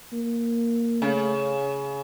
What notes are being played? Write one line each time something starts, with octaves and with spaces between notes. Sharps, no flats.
A#3
C#3 A3